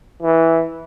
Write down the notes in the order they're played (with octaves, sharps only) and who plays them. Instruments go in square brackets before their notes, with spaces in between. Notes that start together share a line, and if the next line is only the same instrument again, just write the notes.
[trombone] E3